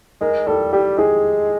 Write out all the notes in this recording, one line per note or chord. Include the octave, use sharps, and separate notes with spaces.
G#3 A#4
G3 A4
G3 G4
G#3 G#4